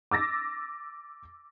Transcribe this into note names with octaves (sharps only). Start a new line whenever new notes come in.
D6 E6 A6 A#6